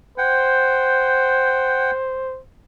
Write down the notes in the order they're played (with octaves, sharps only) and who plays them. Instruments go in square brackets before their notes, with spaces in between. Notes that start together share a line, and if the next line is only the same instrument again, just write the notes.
[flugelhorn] C5 [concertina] F#5 G5